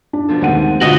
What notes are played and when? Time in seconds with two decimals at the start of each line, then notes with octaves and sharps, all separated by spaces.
0.13 D4
0.28 B2 F3 A4
0.41 D#2 G#3 A3 C4 F#5 D#7
0.81 D3 F3 F#4 D#5